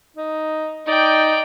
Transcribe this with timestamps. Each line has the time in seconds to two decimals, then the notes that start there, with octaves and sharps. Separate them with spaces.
0.16 D#4
0.86 D#4 D5 G5